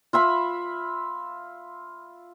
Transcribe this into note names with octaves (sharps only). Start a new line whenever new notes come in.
F4 E5 B5